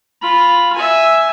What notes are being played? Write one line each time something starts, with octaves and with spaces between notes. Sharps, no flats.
F4 B5
E5 G#5